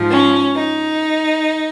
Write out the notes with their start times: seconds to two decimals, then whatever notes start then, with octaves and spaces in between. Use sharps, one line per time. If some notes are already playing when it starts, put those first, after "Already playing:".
Already playing: G#2 F3
0.10 C#4
0.55 D#4